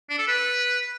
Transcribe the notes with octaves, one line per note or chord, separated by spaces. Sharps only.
D4
A4
B4